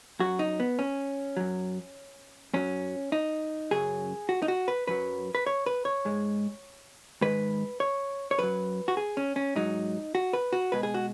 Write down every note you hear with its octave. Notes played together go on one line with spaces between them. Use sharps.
F#2 F#3 F#4
D#4
B3
C#4
F#2 F#3
F#2 F#3 C#4
D#4
F#2 C#3 F#3 G#4
F#4
D#4
F#4
B4
F#2 F#3 B4
B4
C#5
B4
C#5
G#2 G#3
G#2 D#3 G#3 B4
C#5
C#5
F#2 F#3 B4
F#4
G#4
C#4
C#4
G#2 F#3 D#4
F#4
B4
F#4
B2 G#3 B4
G#4
F#4